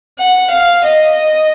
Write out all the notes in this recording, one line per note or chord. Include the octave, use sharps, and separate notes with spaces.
F#5
F5
D#5